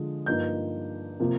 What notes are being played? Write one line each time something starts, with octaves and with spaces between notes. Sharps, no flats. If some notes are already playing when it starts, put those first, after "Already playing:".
Already playing: D3 F3 G#3
G2 F3 A#3 D#4 G6
C3 F3 A#3